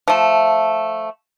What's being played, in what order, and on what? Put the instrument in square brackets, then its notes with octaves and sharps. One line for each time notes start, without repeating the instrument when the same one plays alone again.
[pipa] F3 A3